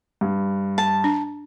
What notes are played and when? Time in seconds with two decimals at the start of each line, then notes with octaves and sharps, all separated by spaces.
0.21 G2
0.78 A5
1.04 D4